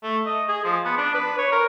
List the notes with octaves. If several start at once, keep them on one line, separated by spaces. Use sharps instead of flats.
A3
D#5
G#4
F3
B3
D4
B4
C#5
A#4